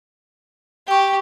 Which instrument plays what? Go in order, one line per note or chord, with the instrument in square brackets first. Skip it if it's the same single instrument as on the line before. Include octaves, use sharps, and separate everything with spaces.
[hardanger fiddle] G4 [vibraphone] G5 C#6